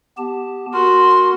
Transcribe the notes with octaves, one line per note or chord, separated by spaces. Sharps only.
B3 G4 A5
B3 F#4 A#4 C6